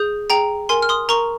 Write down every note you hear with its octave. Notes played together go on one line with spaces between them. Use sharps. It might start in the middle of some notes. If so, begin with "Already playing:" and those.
Already playing: G#4 D#6 G6
G#4 G5 A#5
A#4 G#5 C6
F6
C6 D#6
A#4 A#5 C#6